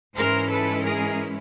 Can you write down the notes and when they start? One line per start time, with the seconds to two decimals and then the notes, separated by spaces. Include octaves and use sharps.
0.16 G#2 E3 G#3 C#4 E4 A#4 C5
0.49 A4 B4
0.82 G#4 A#4